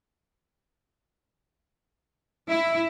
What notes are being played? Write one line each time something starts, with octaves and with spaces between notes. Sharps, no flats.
E4